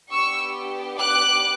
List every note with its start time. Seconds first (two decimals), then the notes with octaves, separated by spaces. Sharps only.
0.11 B3 D4 G4 C#6 E6
0.98 D6 F#6